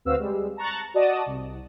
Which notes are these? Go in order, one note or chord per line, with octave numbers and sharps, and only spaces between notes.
D2 C4 F#4 B4 F5 E6
G3 G#3
A5 A#5 C#6 F#6 A6
F#4 D5 D#5 A5 D#6
C2